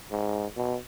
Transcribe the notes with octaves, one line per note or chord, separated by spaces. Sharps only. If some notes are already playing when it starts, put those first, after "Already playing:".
G#2
B2